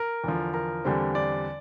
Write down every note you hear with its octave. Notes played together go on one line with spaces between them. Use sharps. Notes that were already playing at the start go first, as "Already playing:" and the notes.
Already playing: A#4
E2 D3 F3
A#4
E2 D3 G3 C4
D5